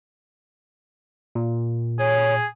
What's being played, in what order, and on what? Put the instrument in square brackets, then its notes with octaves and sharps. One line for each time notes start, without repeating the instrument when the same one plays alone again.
[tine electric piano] A#2
[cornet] G#4 [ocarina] C#5